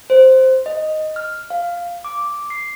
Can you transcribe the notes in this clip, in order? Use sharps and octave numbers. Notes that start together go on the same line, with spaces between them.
C5
D#5
F6
F5
D6
C7